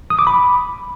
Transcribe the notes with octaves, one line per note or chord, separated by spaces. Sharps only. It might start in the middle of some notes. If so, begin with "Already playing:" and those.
D#6
D6
B5